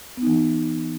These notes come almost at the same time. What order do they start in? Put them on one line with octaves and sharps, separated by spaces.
B3 D#4 E3